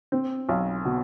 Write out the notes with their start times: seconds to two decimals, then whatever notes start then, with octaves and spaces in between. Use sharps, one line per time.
0.12 C4
0.49 B1
0.85 B2